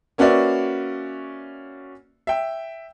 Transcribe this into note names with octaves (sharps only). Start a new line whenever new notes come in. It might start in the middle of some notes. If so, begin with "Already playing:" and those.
A#3 C#4 F#4 B4 D5 E5
E5 G5